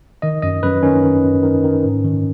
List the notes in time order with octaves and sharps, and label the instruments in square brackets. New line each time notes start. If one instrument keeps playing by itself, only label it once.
[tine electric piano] D#3 D#5
F#2 D#5
F#2 B4
D#3 C#4
D#3
F#2
D#3
D#3
G#2
D#3